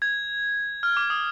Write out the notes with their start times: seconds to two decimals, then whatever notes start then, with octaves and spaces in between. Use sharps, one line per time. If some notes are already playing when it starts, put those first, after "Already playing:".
0.02 G#6
0.83 F6
0.97 D6
1.10 D#6